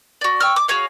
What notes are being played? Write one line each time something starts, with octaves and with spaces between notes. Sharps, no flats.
F#4 D5
G5 C#6 E6 F6
D6
F#4 G#4 C#5 F5